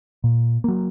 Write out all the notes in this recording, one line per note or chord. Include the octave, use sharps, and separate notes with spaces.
A#2
F#3 A#3